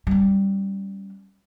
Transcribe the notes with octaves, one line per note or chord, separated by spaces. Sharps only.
G3 C#4